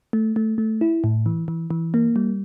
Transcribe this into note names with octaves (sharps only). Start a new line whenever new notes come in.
A3
A3
A3
E4
A2
E3
E3
E3
A#3
G3